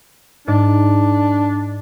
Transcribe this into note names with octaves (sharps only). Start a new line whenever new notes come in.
G#2 D4 D5